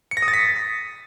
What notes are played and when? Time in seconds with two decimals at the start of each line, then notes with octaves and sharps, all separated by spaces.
0.11 C#7
0.17 A#6
0.22 D#6
0.28 A6
0.33 B6